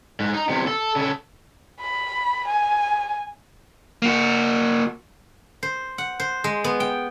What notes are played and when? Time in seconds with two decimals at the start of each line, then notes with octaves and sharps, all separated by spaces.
0.20 G#2
0.34 D#4
0.49 E2 C3
0.67 A4
0.96 C#3 A4
1.80 B5
2.48 G#5
4.02 A#3 F#4
5.63 C5
5.98 F#5
6.20 C5
6.44 G#3
6.64 B3
6.80 G5